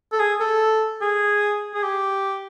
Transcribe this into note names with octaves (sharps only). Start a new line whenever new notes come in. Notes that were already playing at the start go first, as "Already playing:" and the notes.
A4
G#4
A4
G#4
G#4
G4